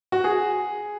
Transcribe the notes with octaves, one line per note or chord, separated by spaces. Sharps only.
F#4
G#4